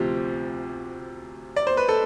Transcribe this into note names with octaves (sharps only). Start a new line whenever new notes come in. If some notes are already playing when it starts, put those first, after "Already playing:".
Already playing: D2 C3 F3 G4
D5
C5
B4
A4